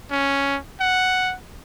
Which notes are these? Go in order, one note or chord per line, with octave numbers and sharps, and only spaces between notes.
C#4
F#5